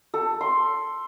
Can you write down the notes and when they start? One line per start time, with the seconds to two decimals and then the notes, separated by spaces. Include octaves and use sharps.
0.14 A4
0.41 C6